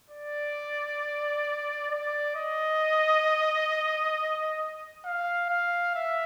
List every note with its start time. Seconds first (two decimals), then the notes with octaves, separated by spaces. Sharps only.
0.10 D5
1.91 D5
2.36 D#5
5.06 F5
5.50 F5
5.95 E5